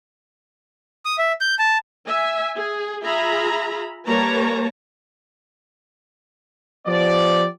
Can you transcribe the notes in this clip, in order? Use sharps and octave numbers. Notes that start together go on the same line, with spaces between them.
D#6
E5
G6
A5
E5 G#5
G#4
F4 G#4 E5 A#5 B5
G3 A#3 B4 C#5 A5 A#5
F3 B3 G4 D5